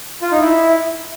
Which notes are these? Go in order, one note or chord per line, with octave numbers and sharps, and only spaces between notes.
F4
D#4
E4